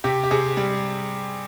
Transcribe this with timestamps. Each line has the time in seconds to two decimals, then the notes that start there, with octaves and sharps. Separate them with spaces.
0.04 C3 G4
0.24 G4
0.31 C3 G#4
0.57 G3